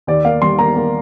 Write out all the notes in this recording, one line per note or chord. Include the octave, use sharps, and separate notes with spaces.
D#2 D5
A#3 F5
G3 C6
A#3 A#5
A#3